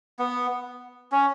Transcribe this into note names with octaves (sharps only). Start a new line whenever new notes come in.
B3
C#4